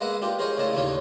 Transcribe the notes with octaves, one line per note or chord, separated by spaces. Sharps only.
G#3 A#3 B3 D#5 E5 F#5
D4 F4 G4
G#4 A#4 C5 C#5 D#5
A2 C#3 D4 D#5 A5
D#2 A#2 D4 D#4 F4 C#5